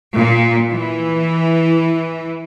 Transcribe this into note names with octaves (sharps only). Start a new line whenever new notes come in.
A#2
E3